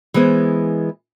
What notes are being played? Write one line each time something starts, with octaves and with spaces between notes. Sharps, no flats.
E3 G#3 B3 G#4 C5